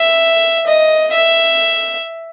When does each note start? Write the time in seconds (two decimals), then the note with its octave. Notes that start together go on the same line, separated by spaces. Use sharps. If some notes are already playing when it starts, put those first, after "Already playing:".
Already playing: E5
0.67 D#5
1.13 E5